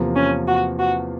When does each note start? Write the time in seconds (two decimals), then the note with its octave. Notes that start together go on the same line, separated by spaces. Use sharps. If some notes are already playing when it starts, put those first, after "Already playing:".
Already playing: E2 C3 F3 A#3
0.16 C#4
0.48 F#4
0.79 F#4